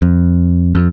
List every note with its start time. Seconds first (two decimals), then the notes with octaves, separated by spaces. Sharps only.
0.02 F2
0.75 F2